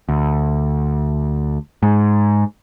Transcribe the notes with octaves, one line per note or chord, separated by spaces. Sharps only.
D2
G#2